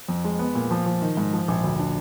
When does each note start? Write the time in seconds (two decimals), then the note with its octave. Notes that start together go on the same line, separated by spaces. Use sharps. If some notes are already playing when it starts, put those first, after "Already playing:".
0.09 F2
0.24 G#3
0.39 B3
0.55 A#2
0.71 F3
0.86 F3
1.02 D#3
1.17 G#2
1.33 F3
1.48 A#1
1.64 D2
1.79 D4